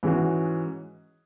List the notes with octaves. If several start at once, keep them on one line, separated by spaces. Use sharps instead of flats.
G#2 E3 G#3 C#4 F#4